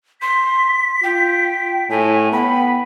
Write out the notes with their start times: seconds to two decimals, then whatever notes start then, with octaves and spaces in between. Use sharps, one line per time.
0.21 C6 B6
1.03 F4 G5
1.89 A2 G#5
2.32 B3 G5 B5